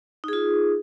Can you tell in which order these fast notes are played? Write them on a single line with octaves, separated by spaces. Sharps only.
D#4 G#4 F4